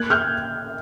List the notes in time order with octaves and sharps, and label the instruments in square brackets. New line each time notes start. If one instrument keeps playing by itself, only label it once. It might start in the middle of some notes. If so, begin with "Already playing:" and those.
Already playing: [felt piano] A#3 F#6 G#6
F6 G6